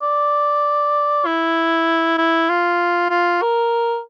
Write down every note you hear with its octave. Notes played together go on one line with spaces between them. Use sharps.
D5
E4
E4
F4
F4
A#4